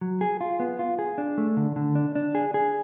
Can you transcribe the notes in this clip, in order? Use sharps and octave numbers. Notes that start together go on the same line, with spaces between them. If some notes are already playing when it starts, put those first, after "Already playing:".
F#3
G#4
F4
B3
F4
G#4
D4
A3
D3
D3
D4
D4
G#4
G#4